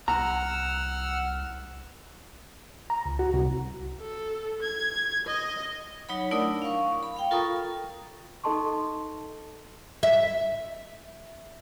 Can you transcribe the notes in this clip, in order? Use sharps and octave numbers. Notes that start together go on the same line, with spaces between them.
C2 F#5 A#5 E6 F6
A#5
C#2
F#4
C2
A4
G#6
D#5
F#3 D#4 C#5 F#5 B5
A3 D4 E4 A#4 D5 D#6
F5 C#6
B5
F5 G5
F4 A4 A#4 A#5 C#6 D#6
D#4 A4 D#5 A5 C6 C#6
E5